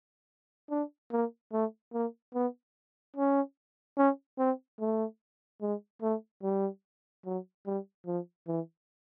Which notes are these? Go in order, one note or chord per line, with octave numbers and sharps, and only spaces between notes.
D4
A#3
A3
A#3
B3
C#4
C#4
C4
A3
G#3
A3
G3
F#3
G3
F3
E3